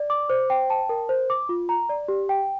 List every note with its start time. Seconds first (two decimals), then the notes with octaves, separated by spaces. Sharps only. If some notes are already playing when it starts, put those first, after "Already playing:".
Already playing: D5
0.10 D6
0.30 C5
0.50 G5
0.70 A5
0.89 A#4
1.09 C5
1.30 D6
1.49 F4
1.69 A#5
1.89 D5
2.08 G4
2.29 G5